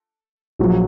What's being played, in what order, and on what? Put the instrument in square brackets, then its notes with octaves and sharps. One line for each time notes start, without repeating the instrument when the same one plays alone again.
[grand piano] A#1 A#2 F#3